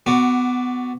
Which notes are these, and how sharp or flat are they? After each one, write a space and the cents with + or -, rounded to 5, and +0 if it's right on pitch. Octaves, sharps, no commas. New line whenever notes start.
B3 +20 F#4 +0 D5 +0